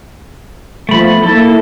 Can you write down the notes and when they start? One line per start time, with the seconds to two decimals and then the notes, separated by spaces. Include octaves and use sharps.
0.89 F3 A3 B3 B5
1.23 A#3 E4 A4